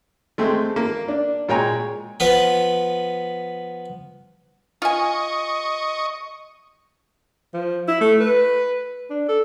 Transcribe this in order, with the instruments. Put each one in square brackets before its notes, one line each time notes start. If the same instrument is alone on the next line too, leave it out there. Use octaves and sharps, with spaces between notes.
[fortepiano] G#3 A3 C4
A#3
D4
A#2 G#3 C#5 G5 G#5 A#5
[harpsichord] F3 B3 B4
[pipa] F4 G#5 [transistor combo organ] D#5 C#6
[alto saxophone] F3
E4
A3
B4
D4
A4